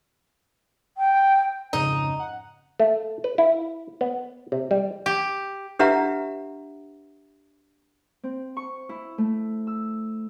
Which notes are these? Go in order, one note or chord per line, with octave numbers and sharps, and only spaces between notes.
G5
F2 G#2 C#3 D#4
F#5
A3
B4
E4
B3
C3
G3
G4
D4 G4 B4 E5 F#5 A#5
C4
C#6
E4
A3
E6